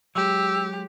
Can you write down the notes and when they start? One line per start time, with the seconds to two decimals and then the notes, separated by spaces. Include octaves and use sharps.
0.15 F#3 G#3 G4 E6